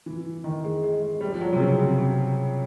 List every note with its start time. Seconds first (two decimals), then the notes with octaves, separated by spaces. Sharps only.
0.06 E3
0.44 D#3
0.64 G#3
0.83 G#3
1.02 G#3
1.21 G3
1.32 F3
1.41 F#3
1.53 C3
1.59 C#3
1.79 C#3
1.98 C3